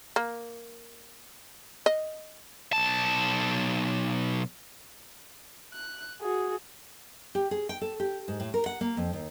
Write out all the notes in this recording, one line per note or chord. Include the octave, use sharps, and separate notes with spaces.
A#3
D#5
B1 A5
F#6
F#4 G#4
G4
G#4
G5
A4
G4
G#2
A2
A#4
F#5
A#3
F2
D#2